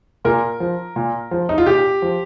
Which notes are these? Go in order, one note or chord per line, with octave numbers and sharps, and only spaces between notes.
A#2 A#4
F3
A#2
F3
D#4
F4
A#2 G4
F3